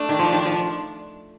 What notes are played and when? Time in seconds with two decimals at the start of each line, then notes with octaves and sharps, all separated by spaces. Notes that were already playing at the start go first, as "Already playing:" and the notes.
Already playing: A3 D4
0.09 D#3
0.19 F3
0.32 D#3
0.46 F3